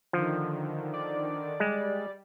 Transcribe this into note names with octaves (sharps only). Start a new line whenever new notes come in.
D3 D#3 F3
D5
G3 G#3